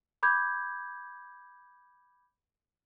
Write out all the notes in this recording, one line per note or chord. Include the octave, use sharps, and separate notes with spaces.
B5 D6 G6 G#6